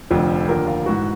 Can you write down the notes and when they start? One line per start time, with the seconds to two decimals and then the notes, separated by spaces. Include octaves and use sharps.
0.11 F1 F2 D3 F3
0.48 D#2 D3 F3 A#4
0.67 F4
0.86 G#2 E3 F#4